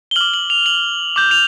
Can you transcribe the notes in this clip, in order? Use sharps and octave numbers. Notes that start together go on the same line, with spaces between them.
G7
D6 F6 F#7
F#7
F7
F#7
D6 G6
F7